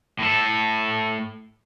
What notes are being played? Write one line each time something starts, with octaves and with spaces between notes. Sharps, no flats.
A2 A4